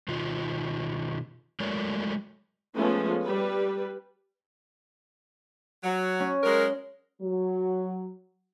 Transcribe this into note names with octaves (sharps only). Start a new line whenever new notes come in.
B2 D#3 F4
F#3 G#3 A3 A#4 C#5 D5
F3 G#3 A3 B3 C#4
G3 B4
F#3
C#4
F#3 G#3 A#4
F#3